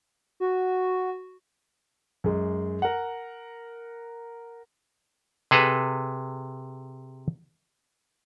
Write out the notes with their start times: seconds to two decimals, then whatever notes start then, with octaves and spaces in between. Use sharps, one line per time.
0.40 F#4
2.24 F#2 G#3
2.82 A#4 F#5
5.51 C3 G#4 A4 B4 A#5